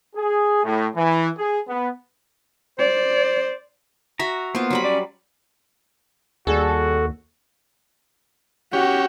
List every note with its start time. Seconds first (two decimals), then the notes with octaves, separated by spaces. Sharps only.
0.16 G#4
0.64 A2
0.96 E3
1.37 G#4
1.68 B3
2.79 C5 D5
4.19 F#4 E5 A#5
4.55 A#3 B3 F4 C5
4.70 F#3 G3 B5
4.84 C#4 D5
6.47 D#2 G3 F#4 G#4 A4
8.73 C#4 F#4 G4